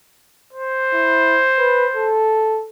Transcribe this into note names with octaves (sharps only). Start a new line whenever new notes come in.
C5
E4
B4
A4